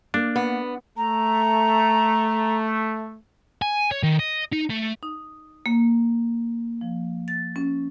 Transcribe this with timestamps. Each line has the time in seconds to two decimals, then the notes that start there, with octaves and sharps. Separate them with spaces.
0.14 A#3 D4
0.36 B3
0.97 A3 A#5
3.62 G#5
3.91 C#5
4.03 D#3
4.19 D#5
4.53 D#4
4.70 A3
5.03 D#4
5.66 A#3
6.81 F3
7.28 A6
7.56 C#4